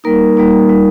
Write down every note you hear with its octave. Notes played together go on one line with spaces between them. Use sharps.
G3 A#3 D#4 A#4
G3 A#3 D#4
G3 D#4